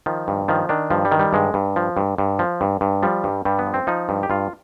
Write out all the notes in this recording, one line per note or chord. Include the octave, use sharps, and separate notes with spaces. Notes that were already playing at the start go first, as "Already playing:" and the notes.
D#3 F3
G2
D#3 F3
D#3 D4
G2 F3
G3
D#3
G3
G2 G#3
G2
F3
G2
G2
F3
G2
G2
F3 G3
G2
G2 G3
B3
F3
C4
F3 D#4
G2
G4
G2 F4